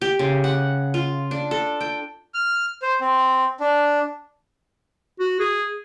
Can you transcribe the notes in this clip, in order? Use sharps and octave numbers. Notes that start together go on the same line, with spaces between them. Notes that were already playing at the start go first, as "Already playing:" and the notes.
G4
C#3
F#5
F4
D4
A4
G5
F6
C5
C4
D4
F#4
G#4